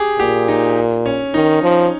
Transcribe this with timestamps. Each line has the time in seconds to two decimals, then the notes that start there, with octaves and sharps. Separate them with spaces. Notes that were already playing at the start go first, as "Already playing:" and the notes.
Already playing: G4 G#4
0.19 A#2 G4
0.48 D#4
1.06 C#4
1.34 D#3 D#4
1.62 F3